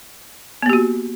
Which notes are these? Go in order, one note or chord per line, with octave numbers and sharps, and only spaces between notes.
A#3 B3 F#4 G4